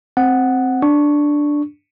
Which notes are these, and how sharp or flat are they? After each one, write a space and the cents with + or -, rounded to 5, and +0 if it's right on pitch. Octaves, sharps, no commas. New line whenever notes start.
C4 +0 F#5 +0
D4 +0 C#6 +0